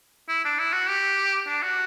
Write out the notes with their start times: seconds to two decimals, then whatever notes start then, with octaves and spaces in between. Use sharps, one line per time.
0.29 E4
0.45 D4
0.59 E4
0.73 F#4
0.89 G4
1.48 D4
1.63 F#4